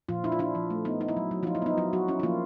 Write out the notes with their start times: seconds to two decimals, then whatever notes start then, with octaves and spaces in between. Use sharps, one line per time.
0.09 A#2 F3 F4
0.24 D4 E4
0.32 F4
0.39 D4 E4
0.55 F3
0.70 A3
0.85 B3 D#4
1.01 D#4
1.08 E4
1.17 F#3
1.31 F#3
1.43 F3 F4
1.47 D#4
1.55 E4
1.62 B3 D#4
1.78 F#3 E4
1.93 F#3 F#4
2.08 C#4 E4
2.20 E4
2.23 F3 A#3 F4